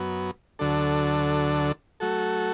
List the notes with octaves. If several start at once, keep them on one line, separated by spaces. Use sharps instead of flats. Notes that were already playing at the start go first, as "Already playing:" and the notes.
Already playing: F#2 F#3 B3
D2 D3 F#3 D4 A4
F#3 A3 F#4 A4